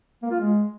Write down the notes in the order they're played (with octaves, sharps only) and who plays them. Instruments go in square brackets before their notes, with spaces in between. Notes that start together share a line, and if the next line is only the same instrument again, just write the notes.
[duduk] A#3
F4
G#3